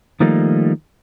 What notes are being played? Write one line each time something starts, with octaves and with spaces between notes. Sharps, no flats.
D#3 F3 G3 A3 A#3 D#4